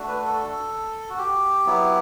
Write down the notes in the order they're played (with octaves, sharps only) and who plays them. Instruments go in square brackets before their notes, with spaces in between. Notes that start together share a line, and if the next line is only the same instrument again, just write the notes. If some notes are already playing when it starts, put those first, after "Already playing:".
Already playing: [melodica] A3 D4 F#4
B4
A4
F#4
G4
F#3 B3 E4